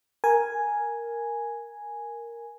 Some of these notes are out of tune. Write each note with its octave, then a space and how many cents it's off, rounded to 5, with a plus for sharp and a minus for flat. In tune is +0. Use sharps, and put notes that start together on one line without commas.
A#4 +0 G#5 +0